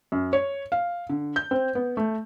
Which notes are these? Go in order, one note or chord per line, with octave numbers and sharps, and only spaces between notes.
F#2
C#5
F5
D3
G6
C4
B3
A3